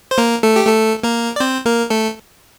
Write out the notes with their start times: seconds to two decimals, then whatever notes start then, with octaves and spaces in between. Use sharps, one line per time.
0.11 C5
0.18 A#3 A#4
0.43 A3 A4
0.56 G4
0.67 A3 A4
1.03 A#3 A#4
1.36 D5
1.40 C4 C5
1.65 A#3 A#4
1.90 A3 A4